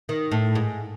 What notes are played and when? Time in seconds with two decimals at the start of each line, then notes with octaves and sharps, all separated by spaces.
0.09 D#3
0.31 A2
0.55 G#2